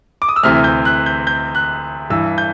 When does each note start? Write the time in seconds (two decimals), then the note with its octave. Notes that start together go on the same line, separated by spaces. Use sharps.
0.22 D6
0.29 D#6
0.36 E6
0.43 D2 C3 E3 F6
0.64 G6
0.85 F#6
1.06 G6
1.27 G6
1.55 F#6
2.10 G2 E3 E6
2.38 G6